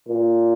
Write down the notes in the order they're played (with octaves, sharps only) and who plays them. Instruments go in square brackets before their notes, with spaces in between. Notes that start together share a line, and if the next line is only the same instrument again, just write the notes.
[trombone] A#2